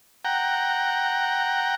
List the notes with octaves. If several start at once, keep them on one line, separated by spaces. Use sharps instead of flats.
F#5 G5 A#5